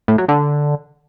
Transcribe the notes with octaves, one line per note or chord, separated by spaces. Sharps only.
A2
F#3
D3